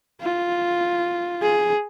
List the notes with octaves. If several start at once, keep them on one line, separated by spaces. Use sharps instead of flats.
F4
G#4